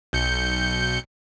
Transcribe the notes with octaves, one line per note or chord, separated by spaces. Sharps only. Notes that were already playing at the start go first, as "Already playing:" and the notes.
B1 G6 C#7